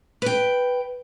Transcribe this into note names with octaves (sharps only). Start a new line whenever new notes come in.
B4 G5